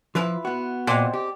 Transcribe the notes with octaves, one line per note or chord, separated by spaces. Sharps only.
F3 E4 F4 B4
B3 F#4
A#2 G#3 C4
G4